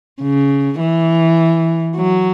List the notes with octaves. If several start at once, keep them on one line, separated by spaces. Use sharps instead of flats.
C#3
E3
F#3